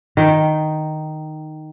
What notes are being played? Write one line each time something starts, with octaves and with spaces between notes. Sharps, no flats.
D#3 G5